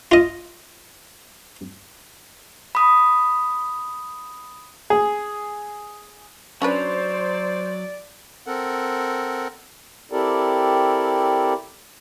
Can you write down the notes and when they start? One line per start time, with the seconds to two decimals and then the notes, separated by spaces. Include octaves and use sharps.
0.12 F4 D#5
2.75 B5 D#6
4.90 G#4
6.62 F#3 C#4 D4 B4 C5 D5
8.46 C4 A4 A#4 F#5
10.12 C4 E4 G4 A4 A#4 D5